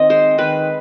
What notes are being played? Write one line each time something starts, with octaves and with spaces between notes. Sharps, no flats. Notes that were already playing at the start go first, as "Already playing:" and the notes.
Already playing: D#3 C4 D#5
G#3 C5
D#3 B4